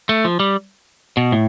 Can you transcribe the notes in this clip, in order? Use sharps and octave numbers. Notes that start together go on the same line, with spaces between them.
A3
F3
G3
B2
A2